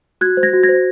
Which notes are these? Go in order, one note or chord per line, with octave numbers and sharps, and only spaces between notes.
F#4 F#6 G#6
C5
G#6 A#6
F#4
G#6 A#6
C5